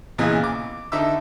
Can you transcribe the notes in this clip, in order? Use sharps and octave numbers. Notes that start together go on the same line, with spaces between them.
A#2 C#3 E3 B3 D#5 F#6
D6
D3 D#4 E5 D6 E6